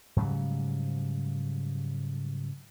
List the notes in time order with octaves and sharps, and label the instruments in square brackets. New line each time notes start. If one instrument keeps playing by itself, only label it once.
[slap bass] G#2 C#3 F#3 G3